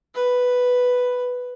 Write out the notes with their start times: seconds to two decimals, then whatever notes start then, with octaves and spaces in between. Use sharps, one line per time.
0.15 B4